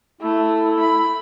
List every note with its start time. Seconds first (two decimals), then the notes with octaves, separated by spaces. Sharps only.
0.21 A3 E4
0.80 B5